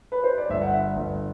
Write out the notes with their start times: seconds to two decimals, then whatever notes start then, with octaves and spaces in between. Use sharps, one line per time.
0.12 B4
0.24 C5
0.38 D5
0.50 G1 E5
0.61 F#5
0.73 E5
0.96 G1